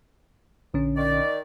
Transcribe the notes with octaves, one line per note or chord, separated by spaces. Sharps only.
A#1 D3 C#4
D#3 D5